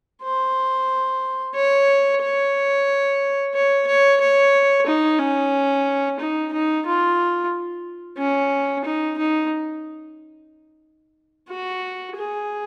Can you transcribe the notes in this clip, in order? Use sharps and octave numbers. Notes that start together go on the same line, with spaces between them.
C5
C#5
C#5
C#5
C#5
C#5
D#4
C#4
D#4
D#4
F4
C#4
D#4
D#4
F#4
G#4